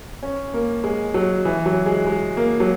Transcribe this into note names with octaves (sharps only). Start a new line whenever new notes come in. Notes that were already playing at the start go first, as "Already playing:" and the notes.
C#4
A#3
G#3
F#3
E3
F#3
G#3
G#3
A#3
F#3